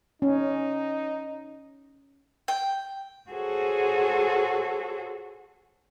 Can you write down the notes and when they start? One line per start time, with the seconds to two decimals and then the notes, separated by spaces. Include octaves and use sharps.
0.22 C#4 D#4
2.48 G5
3.31 F#4 G#4 A4 C5 C#5